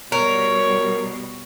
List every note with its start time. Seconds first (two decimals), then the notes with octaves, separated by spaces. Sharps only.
0.12 B2 G3 A#4 C#5